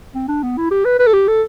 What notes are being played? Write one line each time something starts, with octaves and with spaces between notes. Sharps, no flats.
C4
D4
B3
E4
G4
B4
B4
A4
G4
A4